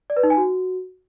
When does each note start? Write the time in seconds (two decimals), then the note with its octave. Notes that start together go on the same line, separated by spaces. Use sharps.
0.10 D5
0.17 B4
0.23 D#4
0.30 G#5
0.37 F#4